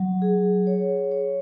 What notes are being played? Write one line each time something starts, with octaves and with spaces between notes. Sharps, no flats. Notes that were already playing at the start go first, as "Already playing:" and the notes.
Already playing: F#3
G#4
C#5
C#5